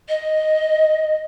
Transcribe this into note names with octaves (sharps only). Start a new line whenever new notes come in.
D#5